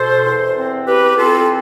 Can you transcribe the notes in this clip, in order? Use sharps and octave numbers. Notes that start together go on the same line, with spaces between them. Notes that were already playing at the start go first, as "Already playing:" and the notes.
Already playing: B2 A4 C5
E2
C4
E2 G4 B4
C4 F4 A4